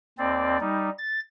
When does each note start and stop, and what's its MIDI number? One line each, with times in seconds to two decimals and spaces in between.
0.18 0.58 39
0.18 0.58 60
0.18 0.58 74
0.60 0.89 55
0.60 0.89 63
0.98 1.20 93